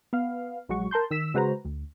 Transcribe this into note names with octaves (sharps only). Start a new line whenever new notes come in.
B3 F5
A#1 F#3 G#3 F#4 C#6
A#4 A5 C6 G6
D#3 E6 B6 E7
C#3 G#3 F#4 B4 C5 A#5
D2